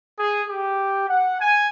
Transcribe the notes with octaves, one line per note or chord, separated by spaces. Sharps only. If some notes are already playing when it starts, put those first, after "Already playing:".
G#4
G4
F#5
G#5